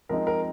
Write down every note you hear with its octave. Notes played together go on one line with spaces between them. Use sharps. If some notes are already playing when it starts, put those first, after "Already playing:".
F3 G#3 C4 D#4 A#4
A#4